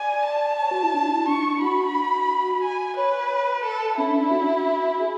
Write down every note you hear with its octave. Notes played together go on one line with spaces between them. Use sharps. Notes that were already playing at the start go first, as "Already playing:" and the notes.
Already playing: D5 G#5
A5
C#5
F#4
E4
D4
E4
D4 C#6
F#4 B5
G#5
B4 C#5
A4
C#4 E4
D4
D4
F#4
G#4